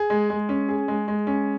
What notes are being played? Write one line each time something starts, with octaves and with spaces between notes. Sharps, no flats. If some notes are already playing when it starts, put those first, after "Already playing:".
Already playing: G#4
G#3
G#3
C#4
G#4
G#3
G#3
C#4